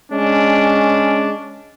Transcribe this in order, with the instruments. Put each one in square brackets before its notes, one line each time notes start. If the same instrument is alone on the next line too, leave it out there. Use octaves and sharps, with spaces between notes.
[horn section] G#3 C#4 D4